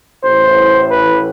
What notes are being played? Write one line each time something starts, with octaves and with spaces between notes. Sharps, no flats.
A1 A2 E3 C5
B4